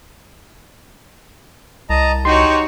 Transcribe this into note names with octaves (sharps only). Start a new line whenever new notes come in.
C2 D#5 A5 A#5
D#4 F#4 G4 C#5 C6